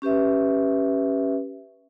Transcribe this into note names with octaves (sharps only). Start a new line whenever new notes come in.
C#4 G4 B4 E5